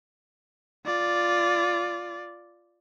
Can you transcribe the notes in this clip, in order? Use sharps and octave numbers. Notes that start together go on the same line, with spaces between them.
F4 D5